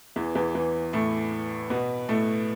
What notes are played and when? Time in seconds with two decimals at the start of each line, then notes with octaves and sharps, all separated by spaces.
0.16 E2 E3
0.35 E2 E3
0.55 E2 E3
0.93 A2 A3
1.70 B2 B3
2.09 A2 A3